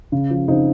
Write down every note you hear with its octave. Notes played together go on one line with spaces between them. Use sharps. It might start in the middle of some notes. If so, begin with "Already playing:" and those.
C#3
F3
C#3 C4 D#4